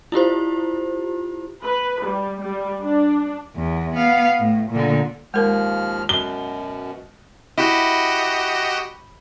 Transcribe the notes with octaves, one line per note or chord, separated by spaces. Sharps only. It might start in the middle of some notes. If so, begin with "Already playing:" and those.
E4 F4 G4 C5
B4
G3
G3
D4
E2
B3 F5
A2
A#2 D3
D#2 F3 G#3 A#4 F6
F#2 B2 G7
E4 F#4 G4 D#5